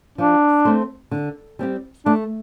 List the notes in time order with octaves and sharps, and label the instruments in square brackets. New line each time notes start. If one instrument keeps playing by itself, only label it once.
[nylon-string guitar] F3 [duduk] D4
[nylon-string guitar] A3 C4 A4 C5
D3
G3 C4 G4
[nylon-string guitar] A3 [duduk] D4